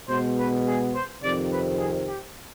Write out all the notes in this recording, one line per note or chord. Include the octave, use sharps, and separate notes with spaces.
B2 G#3 B3 C5
B4
G#4
C5
F2 C3 D#3 D5
B4
G#4
G4